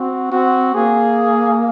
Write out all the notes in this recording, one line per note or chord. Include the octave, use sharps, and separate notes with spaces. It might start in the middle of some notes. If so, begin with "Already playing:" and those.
Already playing: C4 F#4
C4 F#4
A#3 G#4